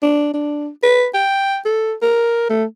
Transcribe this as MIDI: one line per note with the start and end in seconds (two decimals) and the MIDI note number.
0.03 0.33 62
0.34 0.69 62
0.83 1.07 71
1.14 1.58 79
1.66 1.93 69
2.02 2.49 70
2.50 2.64 57